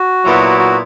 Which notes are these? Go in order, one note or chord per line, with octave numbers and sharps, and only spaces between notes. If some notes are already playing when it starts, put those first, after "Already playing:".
Already playing: F#4
A#2 F#3 B3 E4
F#4